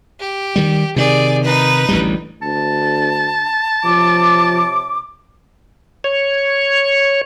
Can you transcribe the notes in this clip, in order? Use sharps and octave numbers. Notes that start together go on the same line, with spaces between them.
G4
D#3 G3
C3 D#3 G#4 D5
D#4 B4
A1 D2 G3
D2 A5
C3 F3 C#5 D6
C#5